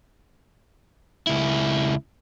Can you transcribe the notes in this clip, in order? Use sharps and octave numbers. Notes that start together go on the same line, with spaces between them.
C#2 E4